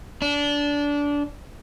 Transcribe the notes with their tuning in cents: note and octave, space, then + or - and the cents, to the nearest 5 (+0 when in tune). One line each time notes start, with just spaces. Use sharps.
D4 -20